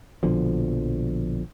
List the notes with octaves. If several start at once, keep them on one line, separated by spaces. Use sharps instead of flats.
A#1 B2 D3 F3